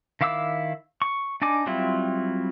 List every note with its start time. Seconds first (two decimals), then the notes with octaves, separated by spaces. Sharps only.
0.21 D#3 E4 F5 D6 E6
1.02 C#6
1.42 D4 D#4 G#5 D6
1.67 F#3 G3 C4 E4 F4